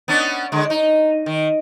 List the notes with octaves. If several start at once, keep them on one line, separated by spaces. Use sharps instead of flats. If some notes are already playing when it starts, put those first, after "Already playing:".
B3 C#4 D4
D3 G#3
D#4
D#3